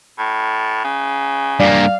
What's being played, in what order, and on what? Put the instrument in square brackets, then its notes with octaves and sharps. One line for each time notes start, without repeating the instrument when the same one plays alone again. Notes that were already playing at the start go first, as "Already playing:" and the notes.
[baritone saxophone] A2
C#3
[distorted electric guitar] G2 A#3 [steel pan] D5 [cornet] F5